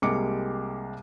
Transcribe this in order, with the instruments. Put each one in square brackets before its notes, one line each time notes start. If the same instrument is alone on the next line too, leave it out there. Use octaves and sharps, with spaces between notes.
[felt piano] C2 G3 G#3 A#3 D6 C#7